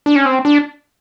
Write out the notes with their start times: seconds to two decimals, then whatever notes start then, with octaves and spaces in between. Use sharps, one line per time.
0.06 D4
0.16 C#4
0.25 C4
0.45 D4